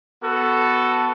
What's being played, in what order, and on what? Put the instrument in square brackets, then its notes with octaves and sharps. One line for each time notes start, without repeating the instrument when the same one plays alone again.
[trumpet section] B3 F#4 A4